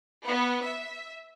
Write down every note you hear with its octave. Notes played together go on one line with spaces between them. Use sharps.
B3
E5